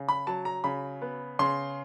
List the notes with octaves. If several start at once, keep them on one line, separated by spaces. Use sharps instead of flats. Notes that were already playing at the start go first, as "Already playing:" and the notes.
Already playing: C#3
B5
F#3 A5
A#5
C#3 B5
B3
C#3 C6